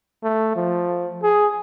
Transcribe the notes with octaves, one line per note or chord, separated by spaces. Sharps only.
A3
F3
G#4